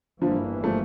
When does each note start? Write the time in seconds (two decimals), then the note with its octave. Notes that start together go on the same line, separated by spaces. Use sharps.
0.21 G1 G2 D3 E3 F3 A#3
0.64 F3 A3